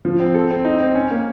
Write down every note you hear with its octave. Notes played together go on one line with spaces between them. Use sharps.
F3
C4
A4
C4
D#4
C4
C#4
A#3